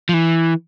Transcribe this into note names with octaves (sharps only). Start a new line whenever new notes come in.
F3
E3